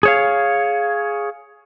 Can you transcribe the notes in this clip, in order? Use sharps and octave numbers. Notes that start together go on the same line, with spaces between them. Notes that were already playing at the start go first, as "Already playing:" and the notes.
G#4 C#5 F5